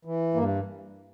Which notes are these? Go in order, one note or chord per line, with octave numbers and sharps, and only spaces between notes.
E3
G2 A#3